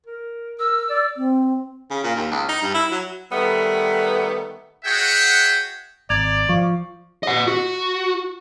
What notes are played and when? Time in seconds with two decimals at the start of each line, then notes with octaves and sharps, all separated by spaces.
0.06 A#4
0.59 A#4 E6
0.89 D5
1.16 C4
1.90 C#3
2.04 A#2
2.16 D#2
2.31 C#2
2.49 D#4
2.62 G2
2.74 E4
2.92 F#3
3.32 D#3 G3 A3 B3
4.85 F#4 G#4 C#5 E5 F#5 G5
6.10 G#1 D5 A#5 G#6 F7
6.49 F3 F5 C#6
7.23 D#5 F#5
7.48 F#4